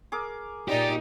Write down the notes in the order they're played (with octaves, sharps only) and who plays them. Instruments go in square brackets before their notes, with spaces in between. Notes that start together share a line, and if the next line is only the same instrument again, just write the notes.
[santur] G#4 A#4 D6
[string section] A#2 D#4 [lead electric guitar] G4 [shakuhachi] D5